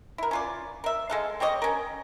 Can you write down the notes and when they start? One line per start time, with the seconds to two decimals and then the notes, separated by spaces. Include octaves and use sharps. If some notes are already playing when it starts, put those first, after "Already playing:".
0.18 E4 A#4
0.31 C#4 F4 D5
0.84 A#4 E5
1.10 G#3 A4 F5
1.40 C4 G4 C#5 D#5
1.62 C#4 A#4